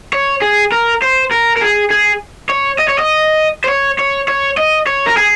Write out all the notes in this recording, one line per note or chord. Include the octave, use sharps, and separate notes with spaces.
C#5
G#4
A#4
C5
A#4
A#4
G#4
G#4
C#5
D#5
C#5
D#5
C5
C#5
C#5
C#5
D#5
C#5
A#4
G#4